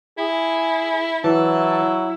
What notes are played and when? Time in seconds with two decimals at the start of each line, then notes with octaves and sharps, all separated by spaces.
0.18 E4 G#4
1.24 E3 F#3 E4 A5